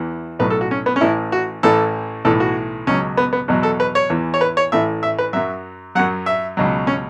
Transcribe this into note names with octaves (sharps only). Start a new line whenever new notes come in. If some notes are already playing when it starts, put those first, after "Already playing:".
Already playing: E2 E3
B1 A2 F#3 B4
A4
F#4
C#4
B3
C#4
A1 A2 E3 E4
F#4
A1 A2 E3 A4
B1 A2 E3 A4
F#4
C#2 B2 F#3 C#4
B3
B3
E2 B2 F#3
A4
B4
C#5
E2 E3
C#5
B4
C#5
A1 A2 E3 E5
E5
B4
F#2 F#3 E5
F#2 F#3 F#5
E5
C#2 B2 F#3
C#4